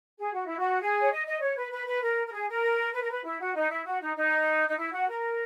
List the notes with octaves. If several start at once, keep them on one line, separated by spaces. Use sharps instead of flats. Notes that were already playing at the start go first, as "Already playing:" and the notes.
G#4
F#4
E4
F#4
G#4
C#5
D#5
D#5
C#5
B4
B4
B4
A#4
A#4
G#4
A#4
B4
A#4
B4
E4
F#4
D#4
E4
F#4
D#4
D#4
D#4
E4
F#4
A#4